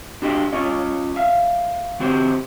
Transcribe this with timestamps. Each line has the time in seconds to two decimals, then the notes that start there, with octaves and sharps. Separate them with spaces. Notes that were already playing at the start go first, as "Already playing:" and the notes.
0.22 D4 F#4 G4 D#5
0.53 C#4 F4 D#5
1.16 E5 F5
1.99 D3 C4 F#4 G4 C5